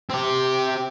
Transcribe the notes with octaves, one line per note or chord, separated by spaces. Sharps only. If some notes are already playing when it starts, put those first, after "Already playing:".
C4 G4